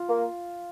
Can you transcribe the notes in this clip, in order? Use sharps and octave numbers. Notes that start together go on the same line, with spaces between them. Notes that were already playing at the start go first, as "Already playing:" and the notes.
Already playing: F4
A#3